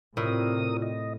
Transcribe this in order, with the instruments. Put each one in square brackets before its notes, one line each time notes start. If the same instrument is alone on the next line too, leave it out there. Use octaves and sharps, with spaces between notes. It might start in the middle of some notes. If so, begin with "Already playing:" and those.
[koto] A2 [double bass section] C3 [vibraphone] E4 F4 D5 [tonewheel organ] A#4 D#6
[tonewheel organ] D#5